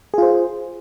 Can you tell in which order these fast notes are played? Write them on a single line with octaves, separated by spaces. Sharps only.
G#4 F4 C5